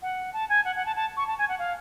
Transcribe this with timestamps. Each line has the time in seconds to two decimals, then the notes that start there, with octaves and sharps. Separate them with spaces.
0.02 F#5
0.33 A5
0.49 G#5
0.65 F#5
0.76 F#5
0.86 A5
0.96 A5
1.17 C#6
1.27 A5
1.38 G#5
1.49 F#5
1.59 F5